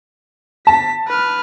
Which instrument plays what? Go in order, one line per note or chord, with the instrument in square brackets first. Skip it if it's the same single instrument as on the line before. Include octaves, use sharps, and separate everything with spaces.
[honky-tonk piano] A5 [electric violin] B6
[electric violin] B4 F6